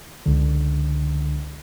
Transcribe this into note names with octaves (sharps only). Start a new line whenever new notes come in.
C#2 D3